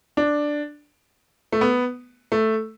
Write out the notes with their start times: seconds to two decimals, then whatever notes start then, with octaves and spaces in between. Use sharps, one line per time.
0.17 D4
1.52 A3
1.61 B3
2.32 A3